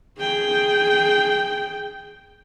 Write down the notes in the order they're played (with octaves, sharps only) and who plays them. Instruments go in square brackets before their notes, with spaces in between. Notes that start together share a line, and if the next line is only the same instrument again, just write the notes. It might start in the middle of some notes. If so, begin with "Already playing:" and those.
[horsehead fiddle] G#4 G5